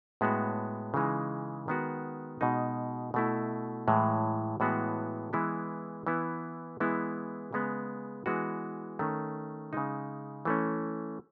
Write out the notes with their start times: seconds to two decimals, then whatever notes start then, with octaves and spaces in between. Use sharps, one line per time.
0.21 A2 G#3 B3 F#4
0.94 C#3 E3 G#3 D#4
1.68 D#3 G#3 B3 F#4
2.41 B2 G#3 D#4
3.14 B2 A3 E4
3.88 A2 E3 G#3
4.60 A2 E3 G#3 B3 F#4
5.33 E3 G#3 B3 E4
6.07 E3 B3 E4
6.80 E3 G#3 B3 E4
7.53 C#3 G#3 B3
8.26 E3 G#3 B3 F#4
8.99 D#3 A3 C#4
9.73 C#3 G#3 D#4
10.45 E3 A3 C#4